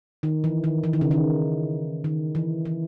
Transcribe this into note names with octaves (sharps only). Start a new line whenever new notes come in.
D#3
E3
D#3
E3
D#3
C#3
D#3
D#3
E3
E3